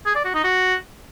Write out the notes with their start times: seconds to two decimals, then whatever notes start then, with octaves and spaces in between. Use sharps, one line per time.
0.06 G#4
0.15 D5
0.25 F#4
0.34 D#4
0.44 F#4